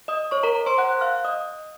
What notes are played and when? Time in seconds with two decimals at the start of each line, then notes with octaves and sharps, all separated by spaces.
0.08 D#5 D#6
0.31 C#5 C#6
0.43 A#4 A#5
0.55 A#4 A#5
0.66 C5 C6
0.78 F#5 F#6
0.97 F#6
1.01 F5 F6
1.25 D#5 D#6